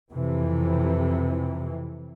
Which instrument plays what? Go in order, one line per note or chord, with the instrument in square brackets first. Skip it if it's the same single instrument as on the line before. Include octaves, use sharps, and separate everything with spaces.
[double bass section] F2 C3 E3